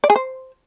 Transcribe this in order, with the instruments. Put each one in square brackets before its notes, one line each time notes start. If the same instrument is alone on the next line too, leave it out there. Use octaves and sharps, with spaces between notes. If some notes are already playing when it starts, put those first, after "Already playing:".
[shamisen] D5
G#4
C5